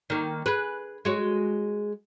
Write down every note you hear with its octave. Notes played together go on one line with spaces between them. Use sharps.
D#3 A#3
G#4 B4
G#3 F#4 C#5